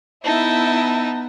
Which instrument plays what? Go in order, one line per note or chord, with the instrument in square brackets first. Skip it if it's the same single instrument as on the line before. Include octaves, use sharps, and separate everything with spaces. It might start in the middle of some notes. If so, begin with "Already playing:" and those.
[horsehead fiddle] B3 [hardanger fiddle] D#4 [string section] E4 E5 [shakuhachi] A5